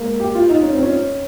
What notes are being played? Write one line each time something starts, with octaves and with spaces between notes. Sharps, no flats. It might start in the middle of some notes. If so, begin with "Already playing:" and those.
Already playing: G#3 A#3
G4
F4
D#4
C#4
C4
C#4